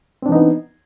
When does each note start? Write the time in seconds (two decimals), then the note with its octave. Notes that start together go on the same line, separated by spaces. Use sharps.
0.22 C4
0.26 D4
0.29 E3
0.32 D#4
0.35 B3